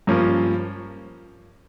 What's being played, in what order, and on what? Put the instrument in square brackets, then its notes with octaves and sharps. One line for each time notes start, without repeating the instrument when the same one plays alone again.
[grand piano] G2 F3 A#3 C#4